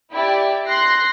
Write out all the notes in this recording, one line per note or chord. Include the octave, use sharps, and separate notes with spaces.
E4 G4 D5
C6 F#6 A#6 C7